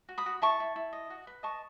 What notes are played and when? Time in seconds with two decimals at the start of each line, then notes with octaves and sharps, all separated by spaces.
0.09 F#4
0.18 B5 D#6
0.26 F#4
0.42 E4 A5 C#6
0.60 E4
0.76 E4
0.93 D#5
1.10 F#4
1.27 B4
1.43 D#5 A5 C#6